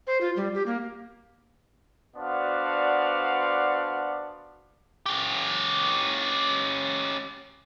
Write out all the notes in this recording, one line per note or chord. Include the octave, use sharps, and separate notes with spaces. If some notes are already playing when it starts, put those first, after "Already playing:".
C5
F4
G3
G4
A#3
B3 D4 F#4 C5 D5 F5
C#4 G4